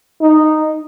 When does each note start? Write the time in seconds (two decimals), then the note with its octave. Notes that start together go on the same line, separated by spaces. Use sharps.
0.21 D#4